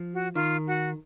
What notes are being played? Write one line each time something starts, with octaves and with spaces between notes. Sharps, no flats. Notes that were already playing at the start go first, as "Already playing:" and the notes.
Already playing: F3
F#4
D#3 F4
F#4